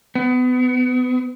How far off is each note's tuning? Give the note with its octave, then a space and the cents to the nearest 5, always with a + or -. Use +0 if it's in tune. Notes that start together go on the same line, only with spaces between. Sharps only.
B3 +30